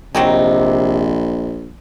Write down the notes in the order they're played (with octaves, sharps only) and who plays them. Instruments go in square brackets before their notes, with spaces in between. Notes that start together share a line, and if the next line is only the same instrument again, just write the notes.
[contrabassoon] A#1 [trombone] C3 [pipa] F#3 C4 D#4